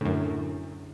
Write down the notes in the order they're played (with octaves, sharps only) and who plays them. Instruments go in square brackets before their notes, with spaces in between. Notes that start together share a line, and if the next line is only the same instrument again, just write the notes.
[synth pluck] F#2 A2 [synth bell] D3 D4 E4